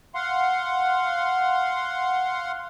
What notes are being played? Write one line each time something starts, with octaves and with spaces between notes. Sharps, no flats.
F5 F#5 C6